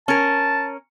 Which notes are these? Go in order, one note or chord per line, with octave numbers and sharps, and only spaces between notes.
C#4 A#4 A5